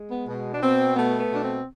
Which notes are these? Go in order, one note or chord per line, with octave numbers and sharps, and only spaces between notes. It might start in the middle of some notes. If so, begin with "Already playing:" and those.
Already playing: G#3
B3
B2
D4
B2 C4
A3 B3
B3
B2 D4
C4